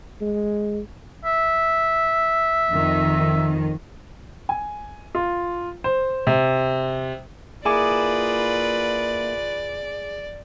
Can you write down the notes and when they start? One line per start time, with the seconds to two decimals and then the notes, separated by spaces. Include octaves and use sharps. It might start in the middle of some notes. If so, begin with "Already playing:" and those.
0.21 G#3
1.25 E5
2.71 F2 D#3
4.49 G#5
5.15 F4
5.84 C5
6.27 C3
7.65 A#3 E4 F4 G#4 B4 D5 G#5 D6